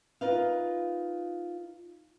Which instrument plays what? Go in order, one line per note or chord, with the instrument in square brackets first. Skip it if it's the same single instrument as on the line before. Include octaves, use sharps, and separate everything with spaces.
[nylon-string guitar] D#4 F4 A#4 B4 D#5 F5